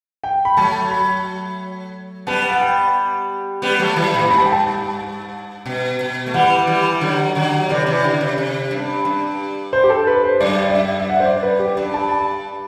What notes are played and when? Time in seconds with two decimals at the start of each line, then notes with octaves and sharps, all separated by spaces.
0.24 G5
0.45 B5
0.57 F#3 A3 A5
0.91 B5
2.27 G3 B3 A5
2.51 F#5
2.61 G5
3.62 G3 B3
3.79 F#3 A3
3.96 E3 G3
4.14 A2
4.31 G2 B5
4.38 A5
4.46 G5
4.53 A5
4.99 A5
5.66 B2
6.01 B2
6.26 A3
6.34 E3 G3 F#5
6.67 E3 G3
7.01 D3 F#3
7.35 D3 F#3
7.69 C3 E3 D5
7.86 C3 E3
8.04 D3
8.21 C3
8.38 C3
8.71 G2
9.05 G2
9.73 C5
9.84 G4
9.90 A4
10.07 B4
10.24 C5
10.40 F#2 D5
10.69 D5
10.75 E5
10.99 E5
11.09 F#5
11.20 C5
11.25 D5
11.43 B4
11.59 G4
11.77 G2 D5
11.94 A5
12.11 A5